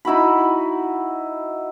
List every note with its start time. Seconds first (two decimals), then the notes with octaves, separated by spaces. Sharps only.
0.05 D#4 E4 F#4 B5